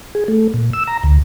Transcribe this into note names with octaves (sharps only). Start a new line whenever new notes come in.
G#4
A3
A#2
E6
A#5
D2